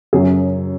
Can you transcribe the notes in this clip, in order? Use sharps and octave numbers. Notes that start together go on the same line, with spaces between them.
F#2 C#3 F#3 G#4